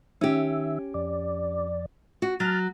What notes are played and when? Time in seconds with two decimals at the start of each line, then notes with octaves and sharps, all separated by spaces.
0.21 D#3 C#4 G4 E5
0.94 F2 D5
2.22 F#4
2.40 F#3 A5 F6